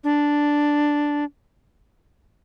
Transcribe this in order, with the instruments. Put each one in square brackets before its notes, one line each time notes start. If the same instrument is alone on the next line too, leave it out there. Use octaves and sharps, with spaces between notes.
[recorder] D4